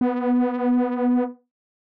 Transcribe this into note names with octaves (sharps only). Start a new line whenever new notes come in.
B3